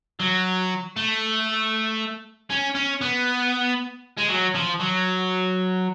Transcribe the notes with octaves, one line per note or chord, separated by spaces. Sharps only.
F#3
A3
C#4
C#4
B3
G#3
F#3
F3
F#3